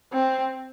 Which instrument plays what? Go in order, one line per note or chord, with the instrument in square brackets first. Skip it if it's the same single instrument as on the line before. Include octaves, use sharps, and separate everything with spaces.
[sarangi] C4